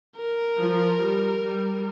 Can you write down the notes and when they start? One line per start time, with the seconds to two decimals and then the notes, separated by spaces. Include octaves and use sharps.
0.17 A#4
0.59 F3
1.02 G3
1.44 G3